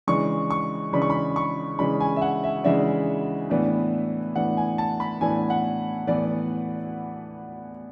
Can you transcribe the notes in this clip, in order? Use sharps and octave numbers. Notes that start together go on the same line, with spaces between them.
C#3 E3 G#3 D4 C#6
C#6
C#3 E3 G#3 D4 B5
C#6
B5
C#6
C#3 E3 G#3 D4 B5
G#5
E5
F#5
E5
C#3 E3 G#3 D4 E5
A2 E3 B3 D4
A2 E3 B3 D4 F#5
G#5
A5
B5
A2 E3 B3 D4 G#5
F#5
A2 E3 B3 D5